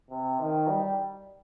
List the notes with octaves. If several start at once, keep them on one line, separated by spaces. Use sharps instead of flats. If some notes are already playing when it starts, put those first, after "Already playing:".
C3
D#3
G3